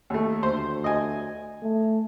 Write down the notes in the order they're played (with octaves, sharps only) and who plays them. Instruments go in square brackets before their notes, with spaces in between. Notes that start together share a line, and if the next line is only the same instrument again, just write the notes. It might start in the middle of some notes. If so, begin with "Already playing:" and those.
[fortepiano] D#2 A3
[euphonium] D2 [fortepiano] C5
[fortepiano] D#5 G#5
[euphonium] A3